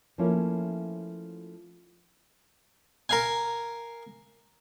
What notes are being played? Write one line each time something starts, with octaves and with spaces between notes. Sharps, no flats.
F3 A3 A#3 C#4 E4
A#4 F5 G#5